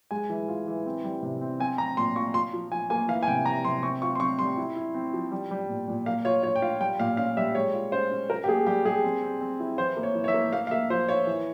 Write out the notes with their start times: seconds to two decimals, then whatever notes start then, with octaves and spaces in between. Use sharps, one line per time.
0.11 G#3 G#5
0.30 E3
0.48 F4
0.67 E3
0.86 C4
1.04 G3
1.23 C3
1.41 C4
1.60 C4 G#5
1.78 C4 A#5
1.97 A#2 C6
2.16 F4 C#6
2.34 F4 C6
2.53 F3
2.72 F3 G#5
2.90 A#3 G#5
3.08 E3 F5
3.23 G#5
3.28 C3 G5
3.46 G3 A#5
3.65 C3 C6
3.83 C4 C#6
4.02 F4 C#6
4.15 C6
4.20 C4 C#6
4.39 G3 C6
4.57 E4
4.76 E4
4.95 C4
5.13 F3
5.32 G3
5.51 G3
5.69 A#2
5.88 A#2
6.06 A#3 F5
6.25 F4 C#5
6.43 F4 C#5
6.56 G5
6.62 F4 F5
6.80 G3 G5
7.00 A#2 F5
7.17 C#4 F5
7.37 G3 E5
7.55 G#3 C#5
7.73 F4
7.92 C#4 C5
8.11 C#4
8.29 F4 A#4
8.44 G4
8.48 A#3 G#4
8.66 G3 G4
8.85 G3 G#4
9.04 C4
9.22 C4
9.41 C4
9.60 E4
9.78 E3 C5
9.97 A#3
10.03 C#5
10.15 E3
10.24 C#5
10.28 E5
10.34 A#3
10.53 A#3 F5
10.67 F5
10.71 A#3 E5
10.90 F3 C5
11.08 F4 C#5
11.27 E3